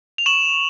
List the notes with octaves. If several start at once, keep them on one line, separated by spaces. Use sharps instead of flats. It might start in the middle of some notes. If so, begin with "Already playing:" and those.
F7
C#6 E7 F#7